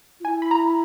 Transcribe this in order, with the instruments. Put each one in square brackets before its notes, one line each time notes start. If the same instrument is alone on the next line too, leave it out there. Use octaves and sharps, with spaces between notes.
[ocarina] F4
[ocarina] E4 [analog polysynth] G#5
[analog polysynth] B5
A#5